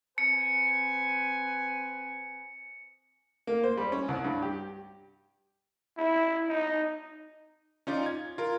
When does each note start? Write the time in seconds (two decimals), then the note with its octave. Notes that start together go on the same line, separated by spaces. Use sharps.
0.18 C4 B4 G#5 C#7
3.47 A#3
3.63 C5
3.77 G3
3.92 C#4
4.08 C2
4.24 G2
4.42 G4
5.97 E4
6.49 D#4
7.87 C#4 D#4 F4 D5
8.06 G#6
8.38 F4 A#4